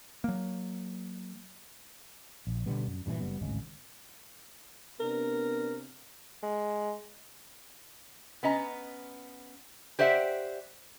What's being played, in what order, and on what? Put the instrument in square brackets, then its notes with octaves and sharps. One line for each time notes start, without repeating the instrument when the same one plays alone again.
[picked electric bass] F#3 A#3
[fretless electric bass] A#1
B2 D3 G3 B3
F#2
G2 A#2 C#3 E3
F#1 G3 B3
D1 G#1 C#3 G#3
[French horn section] C3 B3 D4 [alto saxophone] A#4
[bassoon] G#3
[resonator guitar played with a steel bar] B3 C#4 D#5 A#5
G4 C5 D5 E5 F#5